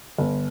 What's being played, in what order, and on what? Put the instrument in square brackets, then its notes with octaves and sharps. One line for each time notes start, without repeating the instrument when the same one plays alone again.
[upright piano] G1